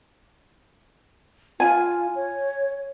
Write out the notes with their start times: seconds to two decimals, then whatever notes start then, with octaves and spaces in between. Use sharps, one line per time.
1.60 F4 G#5
2.15 C#5